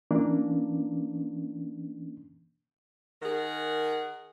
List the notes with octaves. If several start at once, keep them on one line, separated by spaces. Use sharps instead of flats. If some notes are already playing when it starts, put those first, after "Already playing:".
E3 A#3 C#4 D4
D#3 G#4 A#4 F#5